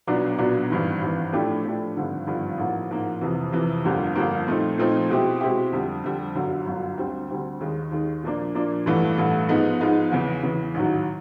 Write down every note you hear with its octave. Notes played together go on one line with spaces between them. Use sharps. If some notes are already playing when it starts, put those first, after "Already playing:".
B1 A#2 F#3 B3 D4
B1 A#2 F#3 B3 D4
G#1 G2 E3
G#1 G2 E3
A2 F3 A3 D4 G4
A2 F3 A3 D4 G4
G#1 G2 D3 F3
G#1 G2 D3 F3
A1 G#2 F3 A#3
A1 G#2 F3 A#3
F2 C3 E3
F2 C3 E3
G1 F2 D3 G3 A#3
G1 F2 D3 G3 A#3
A#2 F3 A3 C4 D#4
A#2 F3 A3 C4 D#4
B2 G#3 C4 E4 G4
B2 G#3 C4 E4 G4
F2 D3 G3
F2 D3 G3
G1 F#2 D3 F#3
G1 F#2 D3 F#3
D2 D3 G3 C4
D2 D3 G3 C4
D#2 D#3 G#3
D#2 D#3 G#3
A#2 F3 A#3 D4
A#2 F3 A#3 D4
A1 G2 E3 A3
A1 G2 E3 A3
G#2 F3 G#3 B3 D#4
G#2 F3 G#3 B3 D#4
E2 C#3 E3
E2 C#3 E3
A1 G#2 D#3 F#3